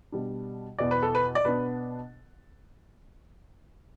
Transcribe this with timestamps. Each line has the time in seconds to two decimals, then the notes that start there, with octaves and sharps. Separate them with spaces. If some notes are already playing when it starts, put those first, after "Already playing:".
0.12 B2 G3 D4
0.79 E2 B2 B3 D5
0.91 B4
1.03 A4
1.15 B4
1.35 D5
1.45 B2 B3 D4 B4